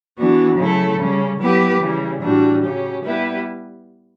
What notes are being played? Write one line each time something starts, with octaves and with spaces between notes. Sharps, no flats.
E3 B3 D4 F#4
C#3 F#3 A3 E4 A4
C#3 G3 C#4
F#3 B3 E4 G4 B4
C#3 E3 G3
A2 E3 G3 D4 F#4
C#3 F#3 C#4 G4
G3 B3 E4 G4 B4